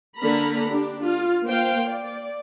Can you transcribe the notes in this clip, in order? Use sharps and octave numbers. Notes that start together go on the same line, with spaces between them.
D3 A#3 A#4 A#5 B5
D4 G4
F4
A#3 C5 F5 G5
D5